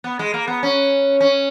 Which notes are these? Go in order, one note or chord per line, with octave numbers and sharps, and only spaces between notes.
B3
G#3
A#3
B3
C#4
C#4